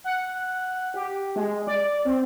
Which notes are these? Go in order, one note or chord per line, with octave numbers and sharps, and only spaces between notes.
F#5
G4
G#3
D5
C4